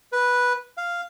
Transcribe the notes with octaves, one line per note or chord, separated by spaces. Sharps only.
B4
F5